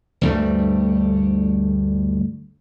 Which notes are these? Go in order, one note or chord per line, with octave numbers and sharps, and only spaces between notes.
D2 G2 G3 A3